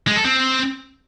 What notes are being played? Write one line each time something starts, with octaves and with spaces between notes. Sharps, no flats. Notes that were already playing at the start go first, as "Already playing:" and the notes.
G#3
A4
C4